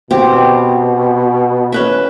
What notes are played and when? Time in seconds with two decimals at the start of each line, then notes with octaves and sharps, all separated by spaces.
0.11 B2 C4 G4
1.72 C#4 B4 E5